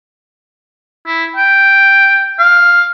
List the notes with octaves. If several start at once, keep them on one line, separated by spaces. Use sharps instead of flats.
E4
G5
F5